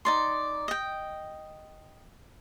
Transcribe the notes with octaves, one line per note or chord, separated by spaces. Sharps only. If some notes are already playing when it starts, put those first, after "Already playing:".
D#4 D5 C6
D#5 G5